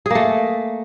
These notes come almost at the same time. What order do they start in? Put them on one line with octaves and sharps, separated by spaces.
G#4 A#3 A3